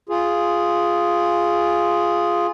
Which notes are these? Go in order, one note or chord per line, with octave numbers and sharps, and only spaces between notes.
F4 G#4